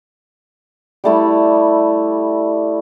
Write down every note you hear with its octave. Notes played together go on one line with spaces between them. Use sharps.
G3 A3 E4